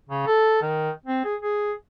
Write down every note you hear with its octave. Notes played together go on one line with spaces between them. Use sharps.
C#3
A4
D#3
C4
G#4
G#4